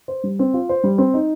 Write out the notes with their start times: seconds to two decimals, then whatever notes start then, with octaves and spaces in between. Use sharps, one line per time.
0.08 C5
0.24 G3
0.39 C4
0.54 F4
0.69 C5
0.84 G3
0.98 C4
1.14 D#4